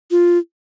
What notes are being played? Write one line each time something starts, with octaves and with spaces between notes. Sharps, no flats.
F4